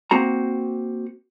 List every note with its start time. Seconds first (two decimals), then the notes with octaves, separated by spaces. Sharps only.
0.11 A#3 C4 F#4 A#5